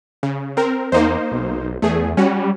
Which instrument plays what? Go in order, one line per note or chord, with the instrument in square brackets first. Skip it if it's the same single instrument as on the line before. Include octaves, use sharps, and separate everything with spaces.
[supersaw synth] C#3
C4 A#4
[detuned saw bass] E2 [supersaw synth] A#3 D#4 C5
[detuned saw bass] B1
[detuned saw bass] E2 [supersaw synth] A3 G#4
[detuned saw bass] G3 [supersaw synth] C#4 F#4